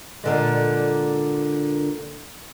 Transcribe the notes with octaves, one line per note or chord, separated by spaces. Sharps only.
A#2 D3 G#3